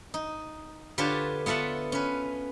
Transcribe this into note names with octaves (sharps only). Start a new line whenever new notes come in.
D#4
D3 F4 G4 B4 C#5 A5
B3 F4 A4 E5 F#5
C#4 B4